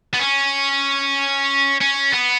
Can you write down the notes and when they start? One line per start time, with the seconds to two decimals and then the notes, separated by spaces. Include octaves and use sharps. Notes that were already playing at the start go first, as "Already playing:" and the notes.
0.14 B3
0.19 C#4
1.81 C#4
2.13 B3